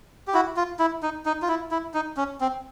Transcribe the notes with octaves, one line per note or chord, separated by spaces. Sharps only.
G4
E4 F#4
F4
E4
D#4
D#4
F4
E4
E4
D#4
C#4
C4